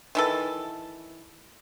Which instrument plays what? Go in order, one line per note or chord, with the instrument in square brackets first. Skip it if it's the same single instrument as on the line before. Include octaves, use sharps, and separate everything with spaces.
[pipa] D#3 E3 A4